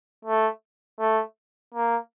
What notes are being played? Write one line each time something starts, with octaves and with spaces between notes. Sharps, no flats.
A3
A3
A#3